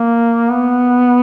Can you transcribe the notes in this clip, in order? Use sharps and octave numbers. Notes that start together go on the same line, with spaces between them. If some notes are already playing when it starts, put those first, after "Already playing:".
Already playing: A#3
B3